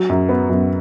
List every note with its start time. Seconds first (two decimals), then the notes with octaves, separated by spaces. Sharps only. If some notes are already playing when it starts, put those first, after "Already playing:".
Already playing: F#3
0.09 F#2
0.29 B3
0.50 F#2